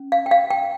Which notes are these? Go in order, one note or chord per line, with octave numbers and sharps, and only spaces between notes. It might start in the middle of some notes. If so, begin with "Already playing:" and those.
Already playing: C#4
F5
G5
F5
G5